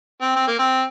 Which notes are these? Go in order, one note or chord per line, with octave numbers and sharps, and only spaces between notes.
C4
C4
A#3
C4